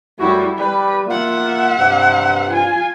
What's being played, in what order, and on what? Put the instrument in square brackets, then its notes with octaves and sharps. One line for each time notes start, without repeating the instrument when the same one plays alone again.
[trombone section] F#2 A3 F#4 [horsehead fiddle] G3 E4
[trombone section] G3 [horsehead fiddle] B4
[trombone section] A#3 F4 [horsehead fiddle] E5 F#5
[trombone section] G2 C3
[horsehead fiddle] F4 G#5